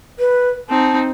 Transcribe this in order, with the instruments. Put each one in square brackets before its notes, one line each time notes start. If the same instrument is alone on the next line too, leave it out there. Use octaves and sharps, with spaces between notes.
[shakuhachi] B4
[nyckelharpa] C4 D#4 [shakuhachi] A5